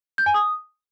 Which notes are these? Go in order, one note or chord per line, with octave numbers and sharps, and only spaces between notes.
G6
G#5
D#6